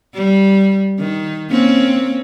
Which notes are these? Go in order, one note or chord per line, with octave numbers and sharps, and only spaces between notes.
G3
D#3
A#3 C4 C#4